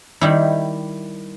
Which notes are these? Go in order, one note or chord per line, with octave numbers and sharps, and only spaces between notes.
D#3 G3 E4